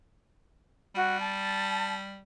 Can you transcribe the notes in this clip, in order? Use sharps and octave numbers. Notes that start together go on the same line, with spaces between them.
G3 F#4
A5